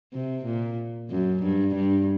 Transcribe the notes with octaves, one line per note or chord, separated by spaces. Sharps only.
C3
A#2
F#2
G2
G2